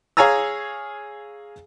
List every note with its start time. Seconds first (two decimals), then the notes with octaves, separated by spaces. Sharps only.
0.17 G#4 C#5 F5 G#5 A#5 E6